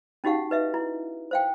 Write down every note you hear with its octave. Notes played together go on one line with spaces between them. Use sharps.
C#4 D#4 F#4 G4 F5 F#5
B4 D#5 E5
E4
C5 F5 G5